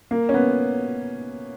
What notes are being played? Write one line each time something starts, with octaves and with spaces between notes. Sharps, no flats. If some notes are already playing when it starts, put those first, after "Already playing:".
A#3
C#4
B3